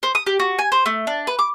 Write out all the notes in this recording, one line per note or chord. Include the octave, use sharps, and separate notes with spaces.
C5
D#6
G4
F#4
G#5
C5
A3
D4
B4
D6